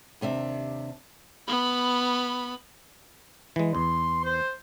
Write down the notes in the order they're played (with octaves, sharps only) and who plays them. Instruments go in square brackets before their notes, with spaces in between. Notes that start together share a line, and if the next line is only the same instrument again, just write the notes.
[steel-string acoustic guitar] D#2 C3 D4 E5
[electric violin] B3 B5
[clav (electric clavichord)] E3 G#3
[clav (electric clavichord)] E2 [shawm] C6
[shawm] C5